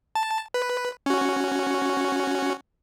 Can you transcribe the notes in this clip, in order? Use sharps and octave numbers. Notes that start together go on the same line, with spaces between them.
A5
B4
C#4 F#4